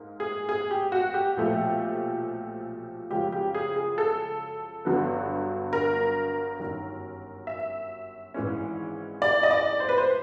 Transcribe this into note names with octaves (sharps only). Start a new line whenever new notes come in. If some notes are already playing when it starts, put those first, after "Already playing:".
Already playing: G#2 A#3
G#4
G#4
G4
F#4
G4
B1 A#2 F3 A3
F#2 C#3 F3 G#3 G4
G4
G#4
G#4
A4
G1 G2 D3 F#3 B3
A#4
G1 F#2 D#3
E5
G#1 G#2 E3 G#3 C#4
D5
D#5
D5
C5
B4
C5